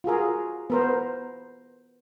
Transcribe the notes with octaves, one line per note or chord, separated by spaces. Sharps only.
F4 F#4 G#4 A#4
B3 A#4 C5